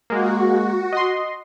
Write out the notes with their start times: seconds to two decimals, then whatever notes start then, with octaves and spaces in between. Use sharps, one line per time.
0.10 G#3 A#3 F#4
0.93 D#5 C6